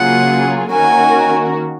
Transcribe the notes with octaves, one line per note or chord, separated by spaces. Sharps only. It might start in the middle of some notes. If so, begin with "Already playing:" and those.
Already playing: C#3 F#3 A#3 F4 G#4 F#5
D#3 A#3 C#4 F#4 A#4 G#5